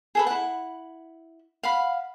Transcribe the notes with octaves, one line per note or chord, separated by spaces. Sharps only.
G#4 A4 B4
E4 F#5
F5 F#5 B5